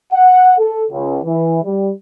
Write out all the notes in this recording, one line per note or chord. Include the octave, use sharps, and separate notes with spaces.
F#5
A4
C#2
E3
G3